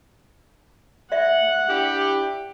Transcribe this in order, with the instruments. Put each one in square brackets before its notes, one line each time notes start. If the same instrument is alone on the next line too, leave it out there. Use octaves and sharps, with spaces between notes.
[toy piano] D5 E5 [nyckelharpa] F#5
[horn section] D4 E4 G4